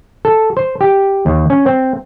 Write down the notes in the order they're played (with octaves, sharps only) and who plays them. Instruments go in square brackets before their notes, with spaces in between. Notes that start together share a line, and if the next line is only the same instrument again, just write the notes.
[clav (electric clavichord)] A4
C5
G4
D#2
C#4
C4